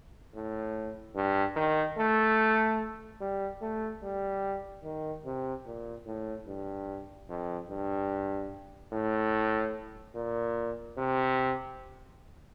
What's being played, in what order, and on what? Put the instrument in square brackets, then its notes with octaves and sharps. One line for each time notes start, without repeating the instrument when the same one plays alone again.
[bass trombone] A2
G2
D#3
A3
G3
A3
G3
D#3
C3
A#2
A2
G2
F2
G2
A2
A#2
C3